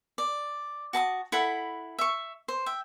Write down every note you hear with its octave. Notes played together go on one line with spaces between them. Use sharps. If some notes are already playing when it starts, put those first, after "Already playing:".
D5
F#4 A5 B5 D#6
E4 A4 F#5 B5
E5 C#6
C5
E5 G5